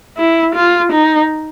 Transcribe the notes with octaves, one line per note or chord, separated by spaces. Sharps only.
E4
F4
D#4